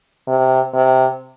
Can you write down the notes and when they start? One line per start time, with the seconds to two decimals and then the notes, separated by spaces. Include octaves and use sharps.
0.28 C3
0.74 C3